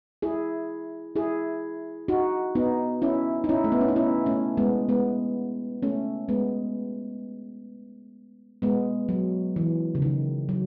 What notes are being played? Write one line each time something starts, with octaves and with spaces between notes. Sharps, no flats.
E4 G#4
E4 G#4
D#4 F#4
B3 D#4
C#4 E4
D#4
C#4 E4
A3
B3
C#4
D#4
C#4 E4
A3 C#4
G#3 B3
G#3 B3
A3 C#4
G#3 B3
G#3 B3
F#3
E3
C#3
D#3
F#3